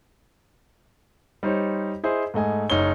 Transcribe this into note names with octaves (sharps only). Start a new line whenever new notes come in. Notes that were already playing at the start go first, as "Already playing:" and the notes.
G3 D#4 C5 C#5
E4 G#4 C5 D#5
G#2 A3 D#5 G#5
F#1 D#4 C#5 G7